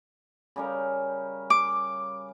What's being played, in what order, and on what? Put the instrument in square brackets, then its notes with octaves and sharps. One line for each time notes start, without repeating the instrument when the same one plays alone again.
[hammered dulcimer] C#3 G3 A#4
[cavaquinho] D6